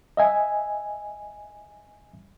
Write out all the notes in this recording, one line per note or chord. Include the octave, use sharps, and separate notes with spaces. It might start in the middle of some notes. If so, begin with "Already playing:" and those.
D#5 E5 G#5